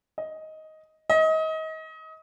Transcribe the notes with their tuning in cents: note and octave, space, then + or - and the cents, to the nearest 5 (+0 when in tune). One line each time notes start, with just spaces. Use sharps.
D#5 +10
D#5 +30